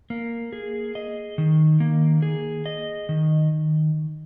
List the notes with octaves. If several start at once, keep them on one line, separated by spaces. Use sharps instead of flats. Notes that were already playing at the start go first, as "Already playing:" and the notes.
A#3
G#4
D#5
D#3
A#3
G#4
D#5
D#3